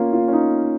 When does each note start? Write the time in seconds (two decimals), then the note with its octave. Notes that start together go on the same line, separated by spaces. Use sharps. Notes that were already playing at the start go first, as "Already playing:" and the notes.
Already playing: A#3 C#4 F4
0.13 F4
0.28 C#4
0.33 D#4